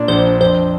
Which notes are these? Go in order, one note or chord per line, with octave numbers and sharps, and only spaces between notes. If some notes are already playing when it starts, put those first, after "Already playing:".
Already playing: A#2 D4
A#1 C5
D4
F2 C5